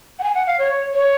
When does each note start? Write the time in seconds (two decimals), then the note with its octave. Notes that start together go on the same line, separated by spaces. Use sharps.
0.19 F#5
0.23 G#5
0.35 F#5
0.47 F5
0.59 C#5
0.94 C#5